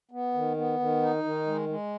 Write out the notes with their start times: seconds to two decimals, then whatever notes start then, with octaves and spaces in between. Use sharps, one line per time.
0.11 B3
0.34 D#3
0.57 B3
0.80 D#3
1.02 D#4
1.24 D#3
1.47 G#3
1.69 G#3